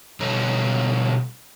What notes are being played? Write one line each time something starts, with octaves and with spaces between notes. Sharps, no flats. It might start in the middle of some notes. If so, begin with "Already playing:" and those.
B2 D3 G3 A4 C#5 A#5